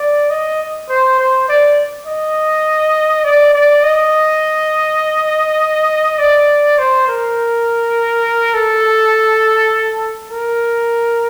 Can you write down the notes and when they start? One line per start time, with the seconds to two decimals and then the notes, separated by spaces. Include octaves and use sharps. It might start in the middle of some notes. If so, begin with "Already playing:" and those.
Already playing: D5
0.30 D#5
0.89 C5
1.19 C5
1.49 D5
2.07 D#5
3.24 D5
3.54 D5
3.83 D#5
6.19 D5
6.79 C5
7.08 A#4
8.54 A4
10.31 A#4